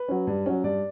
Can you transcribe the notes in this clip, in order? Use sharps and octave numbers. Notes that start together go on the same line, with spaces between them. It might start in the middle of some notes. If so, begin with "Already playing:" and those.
Already playing: B4
F#3 C#4
G2
F#3 C#4
G2 D5